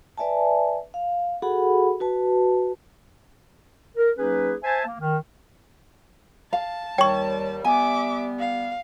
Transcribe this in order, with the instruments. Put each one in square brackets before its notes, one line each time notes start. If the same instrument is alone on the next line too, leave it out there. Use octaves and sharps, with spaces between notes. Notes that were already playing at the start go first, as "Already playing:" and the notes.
[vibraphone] B4 D5 E5 G#5 A5
F5
F#4 G#4 A4 F#5 B5
F#4 B4 A5
[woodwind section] A#4
F#3 A#3 C#4 D#4 G#4 B4
C5 E5 G#5 A5
A#3
D#3
[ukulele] F5 [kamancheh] A5
[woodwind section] D#2 G3 [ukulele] C#5 [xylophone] G5 C#6
[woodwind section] G3 B3 [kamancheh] E5 D6 [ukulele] G#5
[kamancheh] F5